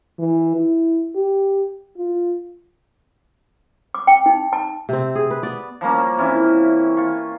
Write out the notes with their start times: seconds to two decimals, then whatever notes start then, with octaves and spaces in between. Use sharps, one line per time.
0.19 E3
0.56 E4
1.15 G4
1.97 F4
3.94 D6
4.07 G5
4.26 D#4
4.53 A5
4.89 C3 C4
5.15 G#4
5.31 B4
5.43 B3 D5
5.81 F3 G3 A#3 C#4
6.17 C3 E3 C#4 E4
6.97 F4 C#6